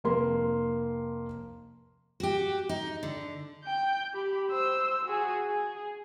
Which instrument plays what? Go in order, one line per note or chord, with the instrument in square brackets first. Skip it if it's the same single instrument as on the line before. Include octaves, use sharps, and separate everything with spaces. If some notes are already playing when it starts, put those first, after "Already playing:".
[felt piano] F1 A#3 C6
[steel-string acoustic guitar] F#4 G4
D#4
D3
[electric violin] G5 G6
G4 B5
C5 E6
F#4 G#4
G#4